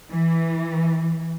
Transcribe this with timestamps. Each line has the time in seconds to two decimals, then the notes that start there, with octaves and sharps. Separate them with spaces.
0.11 E3